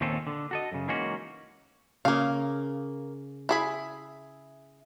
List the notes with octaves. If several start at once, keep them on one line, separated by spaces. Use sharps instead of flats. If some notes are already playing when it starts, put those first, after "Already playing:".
D#2 A#2 C4 C#4 F4 A4
D3
F#4 A4 D#5
F#2 C#3
E3 G#3 A#3 C#4 D#4 F#4
C#3 A#3 F5
E4 G#4 B5